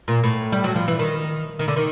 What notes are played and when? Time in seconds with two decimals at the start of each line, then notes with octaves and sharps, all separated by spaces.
0.08 A#2
0.24 A2
0.52 G3
0.64 F#3
0.75 F3
0.88 E3
0.99 D#3
1.59 D#3
1.68 D3
1.77 D#3